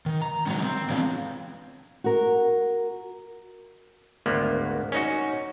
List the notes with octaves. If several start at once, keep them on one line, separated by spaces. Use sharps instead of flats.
D#3
A#5
D3 D#3 F#3 G#3 C#4
C4
E3 G#3 B3 C#4 D4 F4
F#4 A#4
G#1 D2 A#3 B3
C#4 D#4 F#4